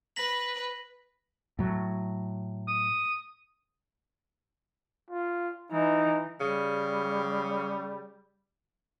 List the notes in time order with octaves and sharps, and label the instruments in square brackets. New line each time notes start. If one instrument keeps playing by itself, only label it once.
[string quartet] B4 [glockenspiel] A#6 B6 F#7
[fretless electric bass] A2 F#3
[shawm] D#6
[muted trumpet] F4
[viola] E3 [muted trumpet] D#4
[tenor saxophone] C#3 [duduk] G3